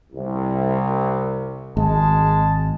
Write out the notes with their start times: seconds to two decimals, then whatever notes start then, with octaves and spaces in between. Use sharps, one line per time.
0.13 C2
1.77 G#1 G#3 A5